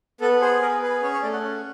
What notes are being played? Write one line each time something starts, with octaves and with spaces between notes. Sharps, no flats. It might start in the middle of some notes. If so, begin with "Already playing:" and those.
B3 A4
G#4 C5
B3 A#4
G#4 B4
C#4 C#5
C#5
A3 D5
F#5
C#4